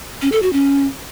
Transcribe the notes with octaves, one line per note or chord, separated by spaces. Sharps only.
C#4
A4
F#4
C#4